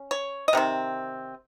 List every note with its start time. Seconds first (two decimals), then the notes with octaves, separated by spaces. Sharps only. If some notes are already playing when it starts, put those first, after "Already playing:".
Already playing: C#4
0.11 C#5
0.48 D#5
0.53 C3 D#3 C4